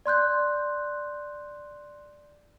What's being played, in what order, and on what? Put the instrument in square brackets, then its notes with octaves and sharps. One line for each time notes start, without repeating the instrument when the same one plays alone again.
[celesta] D5 C6 F#6 G6